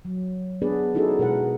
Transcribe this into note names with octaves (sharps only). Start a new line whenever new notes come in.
F#3
B3 D4 G#4 B4 D5
C#4 D#4 E4 F#4 G#4 A4
B2 G#3 A#4 B4 F#5